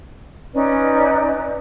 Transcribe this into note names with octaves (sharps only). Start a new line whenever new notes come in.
C#4 D#4 B4 D5